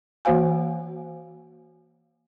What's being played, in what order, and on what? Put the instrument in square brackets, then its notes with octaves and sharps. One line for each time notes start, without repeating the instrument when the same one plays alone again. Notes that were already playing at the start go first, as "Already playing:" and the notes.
[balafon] E3 A#3 F#4 C5 F5 G#5